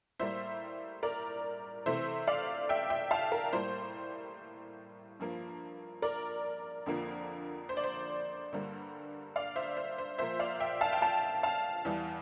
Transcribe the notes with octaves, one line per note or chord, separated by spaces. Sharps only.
A2 G3 A#3 C5 E5
A#4 D5
C3 E3 A3 C5 E5
D5 F5
E5 G5
E5 G5
F5 A5
A#4
A2 G3 A#3 C5
G2 F3 A#3
A#4 D5
F2 D3 F3 A#3
C5
D5
C5
G2 D3 G3 A#3
D5 F5
C5 E5
C5
C5
A#2 F3 A#3 C5 E5
D5 F5
E5 G5
F5 A5
G5
F5 A5
F5 A5
E2 E3 G3